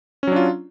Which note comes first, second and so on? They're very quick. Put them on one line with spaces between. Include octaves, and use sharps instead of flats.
C#4 F#3 D4 F4